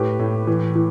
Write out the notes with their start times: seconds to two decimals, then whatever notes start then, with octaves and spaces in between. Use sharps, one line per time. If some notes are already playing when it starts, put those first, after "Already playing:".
Already playing: A2 G4 B4
0.19 A2
0.47 E3
0.75 E3